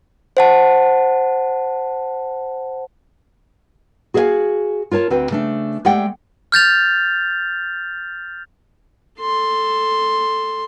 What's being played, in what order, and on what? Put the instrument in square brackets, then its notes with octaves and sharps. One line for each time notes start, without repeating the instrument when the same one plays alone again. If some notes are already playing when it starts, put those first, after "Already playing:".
[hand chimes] C5 F#5 A5
[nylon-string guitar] F#4 G#4 C5 D#5 F5 G#5
F4 A#4 C#5 A5
D2 D3 C4 F#4 B4 G5
C#3 A3 D4
G#3 A3 G4 D5 F#5 G5
[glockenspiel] F6 G6 A6 F7
[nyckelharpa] A4 C6